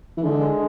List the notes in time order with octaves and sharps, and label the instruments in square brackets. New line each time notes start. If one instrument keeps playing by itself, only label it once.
[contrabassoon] E3
[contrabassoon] D3 [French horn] G#3